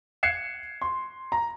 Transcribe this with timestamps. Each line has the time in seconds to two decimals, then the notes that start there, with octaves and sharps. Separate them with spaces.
0.23 F#6 G#6 C7 C#7 E7
0.82 C6
1.32 A#5